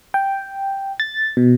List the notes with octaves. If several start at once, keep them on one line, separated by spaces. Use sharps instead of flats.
G5
A6
B2